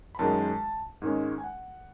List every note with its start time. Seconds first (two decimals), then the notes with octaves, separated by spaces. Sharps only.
0.15 B5
0.19 F#2 D#3 G#3 A5
1.02 G#2 D#3 G#3 C#4
1.38 G#5
1.44 F#5